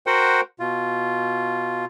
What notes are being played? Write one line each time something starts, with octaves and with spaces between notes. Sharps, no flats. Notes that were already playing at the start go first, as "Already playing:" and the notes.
F#4 A#4 C5 F#5 G5
B2 F4